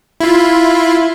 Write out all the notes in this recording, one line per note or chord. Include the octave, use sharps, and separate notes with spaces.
E4 F4